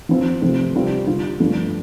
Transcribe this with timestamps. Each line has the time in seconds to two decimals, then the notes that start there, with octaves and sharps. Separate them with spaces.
0.09 F3 C4 F4
0.42 C3 F3 A3 C4
0.74 C3 G3 C4 F4
1.07 D3 G3 F4
1.40 G2 D3 F3 A3